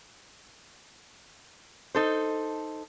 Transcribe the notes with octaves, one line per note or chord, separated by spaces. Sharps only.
D#4 A4 C5